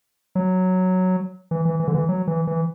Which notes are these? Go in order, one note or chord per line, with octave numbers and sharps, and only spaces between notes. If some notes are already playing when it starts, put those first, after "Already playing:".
F#3
E3
E3
E3
D3
E3
F#3
E3
E3